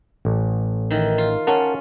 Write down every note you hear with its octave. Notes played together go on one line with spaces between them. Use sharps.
A1
D#3 E3
F4
C#4 A#4 F#5 A5